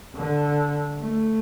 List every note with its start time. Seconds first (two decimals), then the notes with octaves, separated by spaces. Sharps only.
0.16 D3
0.99 A3